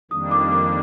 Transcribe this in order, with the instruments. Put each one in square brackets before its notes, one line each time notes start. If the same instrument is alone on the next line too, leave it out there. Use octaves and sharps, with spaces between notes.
[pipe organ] F2 D#3 G3 A#3 D4 [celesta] D#6
[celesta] D6
D6